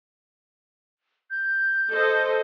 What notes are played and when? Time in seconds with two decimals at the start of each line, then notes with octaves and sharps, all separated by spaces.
1.31 G6
1.93 A4 C5 D#5